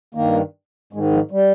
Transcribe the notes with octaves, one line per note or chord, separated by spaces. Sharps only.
G2 D#3 A#3
G#2 D#3 G#3
F3
G3